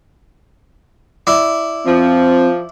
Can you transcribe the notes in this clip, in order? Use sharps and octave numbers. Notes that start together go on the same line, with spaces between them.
E4 D5
F3 C4